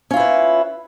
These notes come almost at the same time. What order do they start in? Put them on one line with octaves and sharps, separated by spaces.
C#4 F4 E4 B4